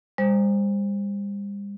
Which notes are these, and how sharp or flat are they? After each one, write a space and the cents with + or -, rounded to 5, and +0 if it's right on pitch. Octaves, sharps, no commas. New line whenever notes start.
G3 +40 C5 +0